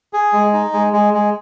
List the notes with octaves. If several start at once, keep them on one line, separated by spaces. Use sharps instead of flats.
G#4
G#3
D#4
G#3
G#3
G#3